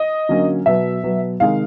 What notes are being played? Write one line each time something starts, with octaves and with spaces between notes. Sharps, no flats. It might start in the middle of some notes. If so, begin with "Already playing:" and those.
Already playing: D#5
D3 F#3 A#3 C#4
B2 F#3 B3 E5
B2 F#3 B3
C3 D#3 G#3 F5